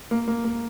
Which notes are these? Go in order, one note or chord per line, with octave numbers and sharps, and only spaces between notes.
A#3
A#3
A#3